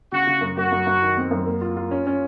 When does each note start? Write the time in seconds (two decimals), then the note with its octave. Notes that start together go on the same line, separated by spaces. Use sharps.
0.12 C#3 F#4
0.27 C#3
0.41 F#2
0.57 F#2 F#4
0.72 F#2
0.86 F#2
1.02 D#3
1.17 C4
1.31 F#2
1.46 A#3
1.62 F4
1.77 F4
1.91 C#4
2.07 C#4